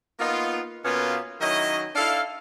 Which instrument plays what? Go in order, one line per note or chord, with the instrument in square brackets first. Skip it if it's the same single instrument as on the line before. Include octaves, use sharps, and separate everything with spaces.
[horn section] A#3 B3 D#4 F4
B2 A#3 B3 C#4 F4 B4
D#3 F#3 C#4 E4 D#5
D4 E4 A4 F5